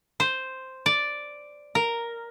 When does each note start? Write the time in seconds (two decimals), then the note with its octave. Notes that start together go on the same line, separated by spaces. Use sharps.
0.20 C5
0.86 D5
1.75 A#4